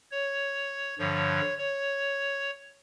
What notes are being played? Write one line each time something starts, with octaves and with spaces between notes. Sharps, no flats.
C#5
G2 D3 F3 C#5
C#5